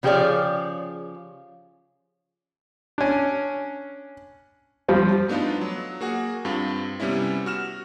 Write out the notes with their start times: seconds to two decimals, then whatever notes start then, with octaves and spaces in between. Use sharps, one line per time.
0.03 C#3 F3 G4 G#4 C#5 D5
2.98 C#4 D4
4.88 G2 F3 G3 C4
5.28 A3 B3 D4 D#4 F4
5.61 F#3
6.01 A#3 F#4 G#4 F#5
6.45 G2 C4 F4
7.00 C3 G3 B3 C#4 E4
7.46 F#4 F6 E7